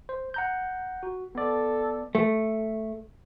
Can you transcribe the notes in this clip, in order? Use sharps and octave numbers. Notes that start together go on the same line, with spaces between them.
C5
F#5 A#5 G6
F#4
B3 A4 D5
A3